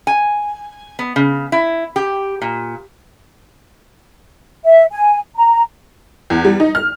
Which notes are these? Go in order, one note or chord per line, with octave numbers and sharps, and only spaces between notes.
G#5
B3
C#3
E4
G4
A#2
E5
G#5
A#5
E2
G3
D#4
F6